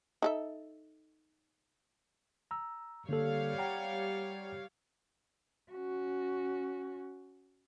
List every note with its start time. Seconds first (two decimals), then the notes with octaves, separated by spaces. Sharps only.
0.22 D#4 A4 E5
2.51 A#5 E6
3.09 D3 G3 A#3 A4 C#5 F5
3.58 F#5 G5 A#5
5.72 C#4 F#4